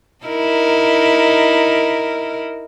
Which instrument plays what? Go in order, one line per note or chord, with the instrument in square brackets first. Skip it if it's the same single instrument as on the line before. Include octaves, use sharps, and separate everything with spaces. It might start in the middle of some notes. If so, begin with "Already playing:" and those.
[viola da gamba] D#4 E4 A#4